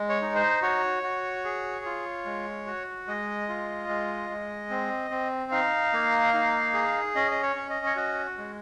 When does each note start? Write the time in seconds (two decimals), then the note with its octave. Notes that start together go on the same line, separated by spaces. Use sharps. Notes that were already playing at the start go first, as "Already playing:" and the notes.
Already playing: G#3
0.09 C#5
0.22 D#4
0.35 C5
0.62 F#4 C#5
1.03 F#4
1.45 G#4
1.85 F4
2.25 G#3
2.66 F#4
3.07 G#3 D#5
3.49 F4
3.88 G#3
4.30 G#3
4.70 C4
5.11 C4
5.51 D#4 F5
5.93 A#3
6.34 D#4
6.74 G#4
7.15 C#4 D#5
7.31 D#5
7.43 C#5
7.56 C#4
7.70 D#5
7.86 C#5
7.96 F#4 D#5
8.38 G#3